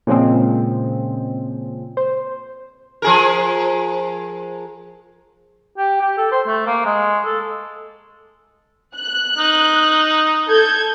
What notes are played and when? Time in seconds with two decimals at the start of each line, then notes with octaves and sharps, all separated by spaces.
0.07 A#2 C#3 F3 G#3 C4
1.97 C5
3.02 F3 G#4 A#4
5.78 G4
6.01 G4
6.17 A4
6.32 C5
6.47 A3
6.67 A#3
6.86 G#3
7.25 A4
8.96 F#6
9.38 D#4
10.49 A4 G6 G#6